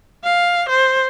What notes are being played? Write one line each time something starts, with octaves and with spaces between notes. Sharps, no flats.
F5
C5